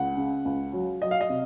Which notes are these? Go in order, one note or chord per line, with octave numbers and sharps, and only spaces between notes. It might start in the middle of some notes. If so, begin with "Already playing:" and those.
Already playing: C#2 F#5
C#3
C#2
F#3
F#3 D#5
F5
D#5
C3